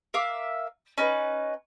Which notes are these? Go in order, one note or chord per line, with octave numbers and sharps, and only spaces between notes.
A#4 E5 F5 D6
C#4 D#4 B4